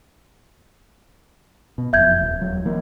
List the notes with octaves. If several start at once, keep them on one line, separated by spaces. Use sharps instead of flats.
B2
F#1 F2 E5 G6 G#6
D#1
D#1 F#3
E3 A#3